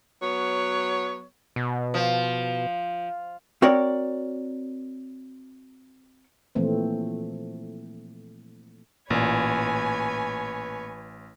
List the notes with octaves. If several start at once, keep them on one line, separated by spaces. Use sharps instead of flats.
F#3 B3 C#5
B2
F3
C4 F#4 A#4 C#5 D5
A#2 E3 F3 A3 C4
A1 A#2 B4 C#5 G#5